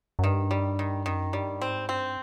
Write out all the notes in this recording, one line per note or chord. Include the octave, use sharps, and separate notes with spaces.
F#2
G2 D#3
G3
D#3
F#2 D#3
G2 G3
G#2 C4
G2 C4